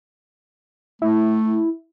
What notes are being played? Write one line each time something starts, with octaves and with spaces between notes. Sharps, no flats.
A3 E4